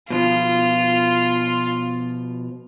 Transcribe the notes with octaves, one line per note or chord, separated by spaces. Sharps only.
B2 F3 F4